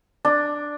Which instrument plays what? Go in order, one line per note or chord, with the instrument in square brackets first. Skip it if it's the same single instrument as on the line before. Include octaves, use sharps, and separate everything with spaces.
[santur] D4